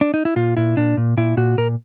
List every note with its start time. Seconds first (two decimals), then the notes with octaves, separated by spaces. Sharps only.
0.01 D4
0.14 D#4
0.25 E4
0.36 A#2 F4
0.57 A#2 E4
0.77 A#2 D4
0.97 A#2
1.17 A#2 E4
1.37 A#2 F#4
1.58 A#2 A#4